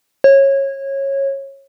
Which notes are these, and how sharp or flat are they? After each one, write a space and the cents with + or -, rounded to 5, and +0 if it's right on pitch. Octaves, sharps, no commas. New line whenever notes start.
C#5 -20